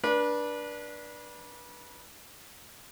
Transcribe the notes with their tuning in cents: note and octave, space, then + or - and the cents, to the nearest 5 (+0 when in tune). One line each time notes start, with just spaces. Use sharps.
D4 +0 B4 -30